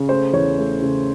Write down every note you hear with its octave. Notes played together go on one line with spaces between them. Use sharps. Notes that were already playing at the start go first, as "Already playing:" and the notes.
Already playing: C#3
A3 C5
E2 C#5
A3
C#3